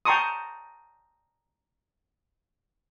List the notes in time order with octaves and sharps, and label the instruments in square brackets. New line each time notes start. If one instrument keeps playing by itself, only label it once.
[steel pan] G5 A5 A#5 C6 C#6 D#6